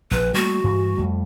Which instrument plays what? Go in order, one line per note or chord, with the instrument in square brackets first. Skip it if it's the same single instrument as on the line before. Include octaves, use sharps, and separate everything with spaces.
[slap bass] A#1 F3 [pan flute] B4
[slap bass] G3 A3 A#3 [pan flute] F#4
[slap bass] G2 E3 G#3
F2 G3 A3